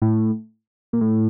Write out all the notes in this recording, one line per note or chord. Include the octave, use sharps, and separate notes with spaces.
A2
A#2
A2